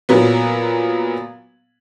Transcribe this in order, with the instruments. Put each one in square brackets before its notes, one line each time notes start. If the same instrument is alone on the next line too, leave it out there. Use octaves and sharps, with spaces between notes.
[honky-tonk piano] A#2 F#3 B3